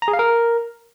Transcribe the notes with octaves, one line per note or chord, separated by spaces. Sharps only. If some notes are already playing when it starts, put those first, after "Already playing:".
A#5
G#4
F5
A#4